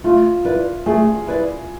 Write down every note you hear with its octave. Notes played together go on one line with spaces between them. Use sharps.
A3 F4
E4 B4 D5
A3 G#4
E4 B4 D5